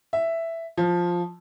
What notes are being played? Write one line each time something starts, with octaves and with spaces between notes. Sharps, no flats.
E5
F3